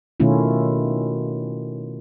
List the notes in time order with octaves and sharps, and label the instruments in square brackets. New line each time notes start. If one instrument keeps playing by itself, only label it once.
[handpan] B2 D#3 A3 C#4 E4 F4